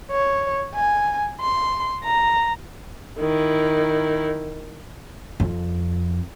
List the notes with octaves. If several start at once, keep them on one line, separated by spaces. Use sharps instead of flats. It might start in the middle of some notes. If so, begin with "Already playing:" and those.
C#5
G#5
C6
A#5
D#3 E4
F2